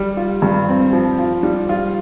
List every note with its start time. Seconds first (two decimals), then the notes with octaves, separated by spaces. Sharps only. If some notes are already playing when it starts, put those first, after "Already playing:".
Already playing: G3
0.17 F4
0.42 G2
0.68 C4
0.93 F3
1.19 F4
1.43 G3
1.69 F4